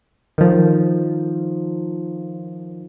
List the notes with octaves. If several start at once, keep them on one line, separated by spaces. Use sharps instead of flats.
D#3 F3